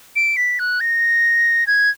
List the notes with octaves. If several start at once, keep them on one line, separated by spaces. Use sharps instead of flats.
D7
B6
F#6
A#6
G#6